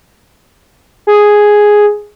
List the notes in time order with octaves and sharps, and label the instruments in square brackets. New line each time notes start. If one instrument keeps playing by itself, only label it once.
[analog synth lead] G#4